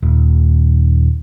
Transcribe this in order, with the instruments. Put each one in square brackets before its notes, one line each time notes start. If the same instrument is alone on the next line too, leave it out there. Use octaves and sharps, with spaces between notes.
[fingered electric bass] D#1